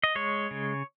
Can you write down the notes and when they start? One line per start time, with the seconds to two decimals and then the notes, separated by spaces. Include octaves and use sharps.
0.04 D#5
0.15 G#3 C#5
0.51 C#3